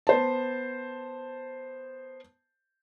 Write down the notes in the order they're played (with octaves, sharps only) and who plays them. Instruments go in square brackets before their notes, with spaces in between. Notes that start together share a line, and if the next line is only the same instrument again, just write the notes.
[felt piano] B3 C5 A5